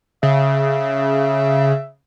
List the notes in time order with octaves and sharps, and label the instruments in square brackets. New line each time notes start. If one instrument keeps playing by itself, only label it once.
[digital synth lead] C#3 [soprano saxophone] E5